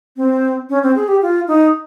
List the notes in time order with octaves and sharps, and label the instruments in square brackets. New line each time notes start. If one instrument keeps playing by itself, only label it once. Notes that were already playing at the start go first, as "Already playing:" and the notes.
[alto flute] C4
C#4
C4
G#4
G4
F4
D#4